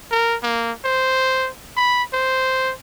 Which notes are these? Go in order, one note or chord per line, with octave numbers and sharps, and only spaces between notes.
A#4
A#3
C5
B5
C5